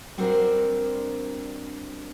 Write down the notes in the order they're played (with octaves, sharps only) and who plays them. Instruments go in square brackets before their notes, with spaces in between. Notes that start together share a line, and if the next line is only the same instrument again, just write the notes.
[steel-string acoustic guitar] G3 C4 D4 F#4 A#4 C5